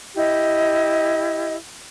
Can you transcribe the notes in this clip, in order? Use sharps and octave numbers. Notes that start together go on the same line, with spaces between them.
E4 G4 D#5